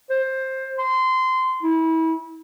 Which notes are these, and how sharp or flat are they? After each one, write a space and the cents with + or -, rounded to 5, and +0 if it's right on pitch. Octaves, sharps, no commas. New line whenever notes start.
C5 +15
C6 -20
E4 -30